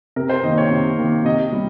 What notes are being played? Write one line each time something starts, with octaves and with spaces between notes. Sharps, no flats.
C3 A#4
C5
D#3 A#3 D#5
C#5
C3
D#3 A#3
C3 D#5
G3